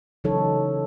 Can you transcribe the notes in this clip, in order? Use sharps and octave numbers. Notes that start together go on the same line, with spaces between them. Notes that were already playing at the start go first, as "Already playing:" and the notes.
C#3 E3 F#3 D#4 A4 C#5